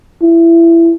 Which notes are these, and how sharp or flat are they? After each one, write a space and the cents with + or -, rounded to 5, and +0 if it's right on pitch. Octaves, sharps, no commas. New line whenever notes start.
E4 +20